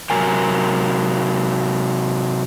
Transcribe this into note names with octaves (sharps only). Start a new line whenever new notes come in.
C3 F#3 A#4 G#5